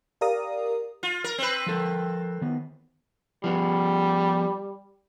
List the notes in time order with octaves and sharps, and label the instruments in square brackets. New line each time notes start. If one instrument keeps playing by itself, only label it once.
[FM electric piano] G4 A#4 D5 F5 A#5 D#6
[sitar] F4
A#4
C4 B4
[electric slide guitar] F3 A4 A#4
D#3 B3
[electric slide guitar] F3 B3 [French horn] G3